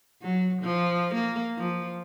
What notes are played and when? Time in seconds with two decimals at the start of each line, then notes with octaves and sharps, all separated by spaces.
0.22 F#3
0.62 F3
1.14 A#3
1.57 F3